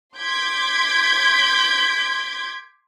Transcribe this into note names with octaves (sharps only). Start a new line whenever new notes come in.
C6 D6 G6 G#6 B6 D7